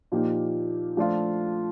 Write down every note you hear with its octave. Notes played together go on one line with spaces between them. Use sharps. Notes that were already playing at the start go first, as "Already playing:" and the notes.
A#2 F3 A#3 D#4 G4
F3 A3 D4 F4